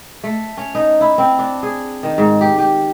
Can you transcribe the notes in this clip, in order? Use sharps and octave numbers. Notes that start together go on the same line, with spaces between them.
A3
C#4
D#4
E4
C4
D4
G#4
D#3
G#2
G4
G4